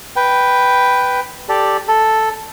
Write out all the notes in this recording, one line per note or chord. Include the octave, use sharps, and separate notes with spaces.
B4 G5
G4 A4 D5
A4